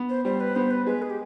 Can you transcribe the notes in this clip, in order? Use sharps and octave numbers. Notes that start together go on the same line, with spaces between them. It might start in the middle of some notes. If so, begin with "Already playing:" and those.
Already playing: B3
C5
G3 C5
B4
B3 C5
B4
G#3 B4
G#4
G4